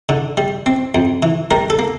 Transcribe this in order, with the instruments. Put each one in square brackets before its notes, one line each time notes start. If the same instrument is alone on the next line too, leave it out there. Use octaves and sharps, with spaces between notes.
[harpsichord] D3
G3
C4
F2
E3
G3 A#4
A4
A#3